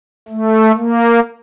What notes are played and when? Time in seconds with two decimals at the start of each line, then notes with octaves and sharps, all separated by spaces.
0.29 A3
0.76 A#3